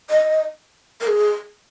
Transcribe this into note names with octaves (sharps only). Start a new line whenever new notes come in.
D#5
A#4
G#4